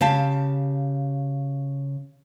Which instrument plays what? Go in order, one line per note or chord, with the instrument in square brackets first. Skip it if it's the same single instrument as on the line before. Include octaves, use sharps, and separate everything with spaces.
[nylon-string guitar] C#3 G4 F5 A5